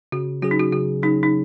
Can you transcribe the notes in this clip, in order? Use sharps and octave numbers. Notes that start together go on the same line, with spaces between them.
C#3 F#4
F#3 C#4 F#4 G#4
D#4
F#4
C#3 F#4
F#3 C#4 D#4 G#4
D#4